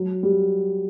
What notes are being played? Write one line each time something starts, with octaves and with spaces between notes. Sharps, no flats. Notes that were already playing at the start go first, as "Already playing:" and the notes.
Already playing: F#3
G3